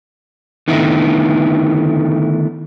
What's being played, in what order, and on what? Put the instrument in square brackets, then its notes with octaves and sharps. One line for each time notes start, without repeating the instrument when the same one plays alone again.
[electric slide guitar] D3 D#3 A3 B3 D#4 E4